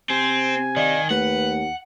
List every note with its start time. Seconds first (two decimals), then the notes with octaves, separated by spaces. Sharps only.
0.10 C3 C4 G#5
0.77 D#3 D5 D#5 F5
1.11 D#2 A3 B4 F#5